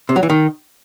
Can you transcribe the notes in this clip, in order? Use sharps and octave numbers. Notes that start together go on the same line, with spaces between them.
C3
F#3
E3
D#3